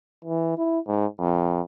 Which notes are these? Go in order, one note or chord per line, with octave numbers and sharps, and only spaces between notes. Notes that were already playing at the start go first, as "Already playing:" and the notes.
E3
E4
G#2
F2